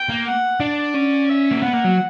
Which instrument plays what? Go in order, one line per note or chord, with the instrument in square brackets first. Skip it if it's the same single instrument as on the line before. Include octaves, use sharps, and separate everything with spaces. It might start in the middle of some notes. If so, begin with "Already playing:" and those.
Already playing: [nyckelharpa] G5
[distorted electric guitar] A#3
[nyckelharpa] F#5
[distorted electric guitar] D4 [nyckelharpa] D5
[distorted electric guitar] C#4
[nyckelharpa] E5
[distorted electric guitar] A#3
[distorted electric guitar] B3 [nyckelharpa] F#5
[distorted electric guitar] A#3
F#3